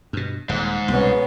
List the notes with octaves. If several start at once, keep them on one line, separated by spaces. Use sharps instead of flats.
G2 B2
D#1 G#2
C2 B2 B3 C#4